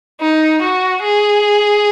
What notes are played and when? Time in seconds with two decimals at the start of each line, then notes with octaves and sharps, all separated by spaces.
0.21 D#4
0.62 F#4
1.03 G#4